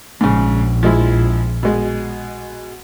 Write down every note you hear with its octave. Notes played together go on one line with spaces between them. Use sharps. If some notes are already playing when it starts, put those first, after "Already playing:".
A#1 G#2 C#3
F3 G#3 E4
B2 G#3